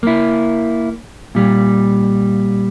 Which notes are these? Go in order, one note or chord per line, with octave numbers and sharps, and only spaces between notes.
A#3 E4
A#2 G3